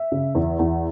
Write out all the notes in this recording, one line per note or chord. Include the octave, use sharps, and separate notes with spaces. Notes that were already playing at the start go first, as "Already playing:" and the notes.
Already playing: E5
C#3
E2
E2